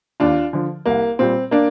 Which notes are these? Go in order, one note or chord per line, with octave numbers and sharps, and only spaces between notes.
D#2 D4 F4
D3 F3
C2 A#3
A#2 G3 C4
A#3 D4